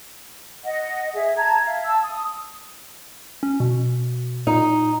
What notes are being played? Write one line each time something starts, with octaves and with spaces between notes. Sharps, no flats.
D#5 F#5
G#4 E5
A5 A#5 G#6
E5 F5
A5 E6
D#6
C#4
B2
A#2 D#4